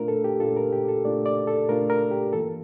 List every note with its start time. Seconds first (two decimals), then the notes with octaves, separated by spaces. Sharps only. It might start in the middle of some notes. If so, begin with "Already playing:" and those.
Already playing: A#2 A3 D4 F4 A#4
0.08 A4
0.24 G4
0.40 A#2 A3 D4 F4 A4
0.56 A#4
0.73 G4
0.88 A4
1.04 A#2 A3 D4 F4 D5
1.26 D5
1.47 A4
1.69 A#2 A3 D4 F4 A#4
1.90 A#4
2.11 G4
2.32 G2 E3 A#3 F4 A4